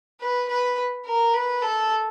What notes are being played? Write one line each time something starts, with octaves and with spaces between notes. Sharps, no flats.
B4
B4
A#4
B4
A4